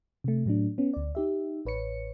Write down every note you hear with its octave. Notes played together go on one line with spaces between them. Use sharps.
C3 A3
A2 F#3 A3 D4
B3 C#4
D2 D5
D#4 G4 E5
A1 B4 C#5 C#7